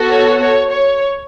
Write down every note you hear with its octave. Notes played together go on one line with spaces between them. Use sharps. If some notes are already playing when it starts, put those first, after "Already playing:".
Already playing: B3 F#4 A4
C#5
C#5
C#5